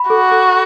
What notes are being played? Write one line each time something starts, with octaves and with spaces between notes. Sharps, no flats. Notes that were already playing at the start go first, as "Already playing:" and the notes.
Already playing: B5
F#4 A4
A4